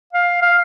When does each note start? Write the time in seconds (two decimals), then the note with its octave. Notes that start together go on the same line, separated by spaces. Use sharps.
0.13 F5
0.42 F5